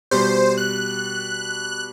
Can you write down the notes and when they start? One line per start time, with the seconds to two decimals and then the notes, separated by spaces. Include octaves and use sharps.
0.11 B2 G3 C5
0.58 F#6